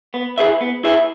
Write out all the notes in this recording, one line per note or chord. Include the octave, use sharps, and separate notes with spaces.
B3
E4 G#4 B4 E5
B3
E4 G#4 B4 E5